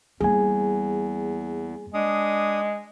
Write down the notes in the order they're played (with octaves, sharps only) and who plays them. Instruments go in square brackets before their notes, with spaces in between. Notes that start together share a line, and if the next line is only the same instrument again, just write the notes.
[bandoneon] E2 [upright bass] G3 A#3 [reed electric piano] G#4 G#5
[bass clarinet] G#3 [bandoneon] D4 D#6